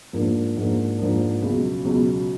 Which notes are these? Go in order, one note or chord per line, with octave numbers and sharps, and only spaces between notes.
G#2 F3 A#3 D4
G#2 F3 A#3 D4
G#2 F3 A#3 D4
C#2 B2 F#3
C#2 B2 F#3